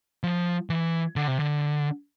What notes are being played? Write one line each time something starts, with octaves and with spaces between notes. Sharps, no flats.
F3
E3
D3
C3
D3